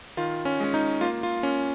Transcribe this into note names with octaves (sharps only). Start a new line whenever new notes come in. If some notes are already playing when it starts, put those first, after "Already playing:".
D#3 F4
C#4
G#3 C#4
D#4
A#3 F4
F4
A#3 C#4